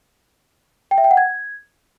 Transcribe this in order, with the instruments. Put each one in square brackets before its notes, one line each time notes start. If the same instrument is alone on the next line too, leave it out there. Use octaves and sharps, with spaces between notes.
[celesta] G5
E5
G5
F#5
G#6